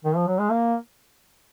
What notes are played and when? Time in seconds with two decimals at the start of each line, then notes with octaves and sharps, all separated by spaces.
0.04 D#3
0.16 F3
0.27 F#3
0.39 G#3
0.50 A#3